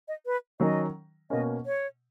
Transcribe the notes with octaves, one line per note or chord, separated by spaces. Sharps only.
D#5
B4
D#3 F#3 C#4 D#5
B2 A#3 C#4 D#5
C#5